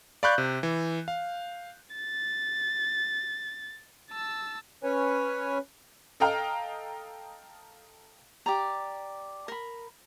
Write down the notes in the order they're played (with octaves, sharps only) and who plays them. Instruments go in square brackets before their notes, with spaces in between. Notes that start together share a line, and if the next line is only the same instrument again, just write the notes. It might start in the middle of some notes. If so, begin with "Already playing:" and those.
[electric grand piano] D5 F5 B5 C#6 F#6 G6
C3
E3
F5
[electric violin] A6
A5 E6
[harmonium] C#4 B4 C#5 G#5
[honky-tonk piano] A4 D#5 F5 G5 A#5 F6
[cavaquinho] G4 D5 A#5
A#4 B5